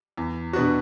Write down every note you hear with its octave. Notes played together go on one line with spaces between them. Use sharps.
E2
B2 B3 D4 F#4